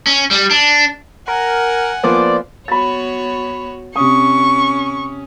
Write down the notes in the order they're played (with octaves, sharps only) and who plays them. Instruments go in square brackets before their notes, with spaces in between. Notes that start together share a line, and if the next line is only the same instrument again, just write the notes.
[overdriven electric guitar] C#4
G3
D4
[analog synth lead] A#4 [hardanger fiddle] F#5 G#5
[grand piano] F3 A#3 B3 [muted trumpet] C5 [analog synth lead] D5
[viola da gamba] B3 F#4 C#5 [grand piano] B5 A6
[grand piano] C3 D#6 [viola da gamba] C#4 [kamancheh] C#6